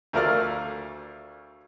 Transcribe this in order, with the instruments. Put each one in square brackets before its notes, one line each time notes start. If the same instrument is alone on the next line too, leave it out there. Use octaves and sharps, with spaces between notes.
[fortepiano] D2 A3 F4 A#4 D5 F6